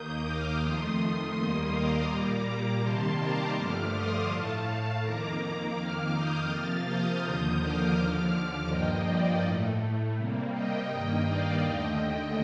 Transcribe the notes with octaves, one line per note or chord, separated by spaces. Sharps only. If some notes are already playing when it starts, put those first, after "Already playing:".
Already playing: D#2 D#3 A#3 D#6 G6
D6 F6
F2 D#3 A3 C6 D#6
D#2 D#3 G3 A#3
A#5 D6
A#2 G3 A#3
C3 D#3 G3 A#3 A5 C6
A#5 D6
G2 D3 F3 A3 D6 F6
C6 D#6
A2 A3 F5 A5
F2 D#3 A#3 A#5 D6
F2 D#3 A#3 D6 F6
D#6 G6
C3 F3 A#3 F6 A6
D#6 G6
D#2 D3 F3 A#3
D6 F6
D#2 D3 F3
G2 F3 A#3 D#5 G5
D5
A2 A3
C3 G3 A#3
D#5 G5
G2 D#3 A#3
D5 F5
D#2 D3 A3 D#5 G5
D#5 G5